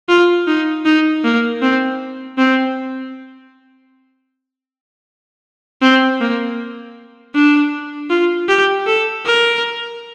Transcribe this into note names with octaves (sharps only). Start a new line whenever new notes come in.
F4
D#4
D#4
A#3
C4
C4
C4
A#3
D4
F4
G4
A4
A#4